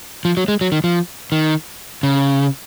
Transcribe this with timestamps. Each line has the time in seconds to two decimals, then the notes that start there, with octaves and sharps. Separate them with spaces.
0.25 F3
0.37 F#3
0.48 G#3
0.61 F#3
0.72 D#3
0.84 F3
1.32 D#3
2.03 C#3